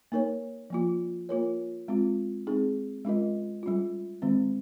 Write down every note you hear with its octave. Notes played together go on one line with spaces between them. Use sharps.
A#3 D#4 A#4 C#5
F3 A#3 F4
A#3 F4 A#4 C#5
G#3 C4 F4
G#3 C4 D#4 G#4
G#3 C#4 F4 A#4 D#5
G3 C#4 F4
D#3 G#3 C4